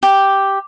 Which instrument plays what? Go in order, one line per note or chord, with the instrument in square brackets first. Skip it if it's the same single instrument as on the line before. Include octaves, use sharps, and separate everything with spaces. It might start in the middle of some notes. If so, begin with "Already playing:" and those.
[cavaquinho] G4